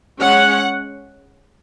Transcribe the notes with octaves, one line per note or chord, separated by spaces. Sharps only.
G#3 C#4 F#5